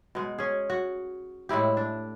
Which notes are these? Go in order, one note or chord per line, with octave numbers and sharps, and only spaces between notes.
B2 G#3
C#4 G#4
F#4
A2 G#3 E4 G4
D4